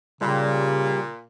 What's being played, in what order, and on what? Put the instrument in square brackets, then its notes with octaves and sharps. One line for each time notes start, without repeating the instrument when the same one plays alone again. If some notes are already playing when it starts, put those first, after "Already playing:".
[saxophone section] A#2 [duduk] C#3 [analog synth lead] G3